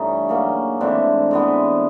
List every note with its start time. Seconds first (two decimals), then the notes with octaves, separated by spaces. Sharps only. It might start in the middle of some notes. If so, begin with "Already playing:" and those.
Already playing: G2 E3 A3 C#4 D#4
0.29 C#3 F#3 A#3
0.80 G#2 E3 A3 C4 D4
1.31 G#2 E3 G#3 B3